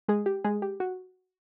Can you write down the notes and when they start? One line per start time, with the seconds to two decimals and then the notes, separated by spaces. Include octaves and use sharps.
0.08 G#3 G#4
0.26 G4
0.44 G#3 G#4
0.62 G4
0.80 F#4